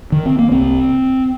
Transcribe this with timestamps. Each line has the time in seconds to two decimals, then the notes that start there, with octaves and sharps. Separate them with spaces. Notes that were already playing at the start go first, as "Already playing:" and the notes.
0.12 D#3
0.26 C4
0.39 A#3
0.51 C2 C3 C4